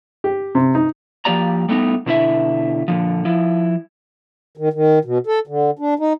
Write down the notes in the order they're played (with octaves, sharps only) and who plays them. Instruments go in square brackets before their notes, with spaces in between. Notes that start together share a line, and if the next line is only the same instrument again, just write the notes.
[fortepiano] G4
C3
D#4
[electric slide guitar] F3 A#3 G4 D5 A#5
G3 A3 B3 D#4
B2 D3 E4 E5
A#2 D3 F3
F3 E4
[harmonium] D#3
D#3
B2
A4
D3
D4
D#4